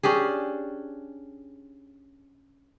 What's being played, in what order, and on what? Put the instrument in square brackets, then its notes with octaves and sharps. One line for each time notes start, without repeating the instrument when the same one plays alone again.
[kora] C#4 D4 G4 G#4